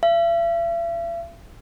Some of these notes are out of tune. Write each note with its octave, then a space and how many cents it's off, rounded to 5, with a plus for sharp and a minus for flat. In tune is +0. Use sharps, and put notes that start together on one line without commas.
E5 +45